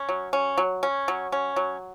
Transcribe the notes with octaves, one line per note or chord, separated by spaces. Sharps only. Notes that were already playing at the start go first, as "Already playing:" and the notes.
Already playing: C#4
F#3
C#4
F#3
C#4
F#3
C#4
F#3